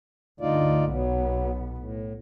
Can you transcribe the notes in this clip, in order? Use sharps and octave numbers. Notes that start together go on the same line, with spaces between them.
D2 G2 D3 D#4 F4 D5
B1 B2 F#3 B3
A2